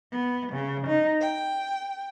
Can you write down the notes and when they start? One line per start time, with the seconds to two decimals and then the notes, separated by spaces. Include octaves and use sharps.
0.13 B3
0.52 C#3
0.87 D#4
1.21 G5